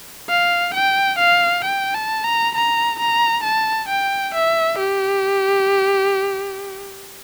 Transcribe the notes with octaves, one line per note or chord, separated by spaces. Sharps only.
F5
G5
F5
G5
A5
A#5
A#5
A#5
A5
G5
E5
G4